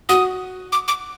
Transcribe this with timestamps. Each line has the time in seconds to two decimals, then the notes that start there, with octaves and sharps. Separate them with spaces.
0.09 F#4 D#6
0.72 D6
0.88 D6